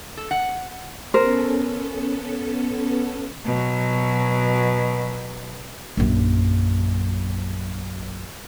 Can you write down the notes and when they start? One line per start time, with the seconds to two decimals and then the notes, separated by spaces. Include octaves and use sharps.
0.17 A4
0.31 F#5
1.14 B3 C#4 A4 A#4 C5
3.45 B2 F#3
5.97 A#1 F#2